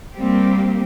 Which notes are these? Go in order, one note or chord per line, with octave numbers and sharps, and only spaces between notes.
G3 A#3 C4 G4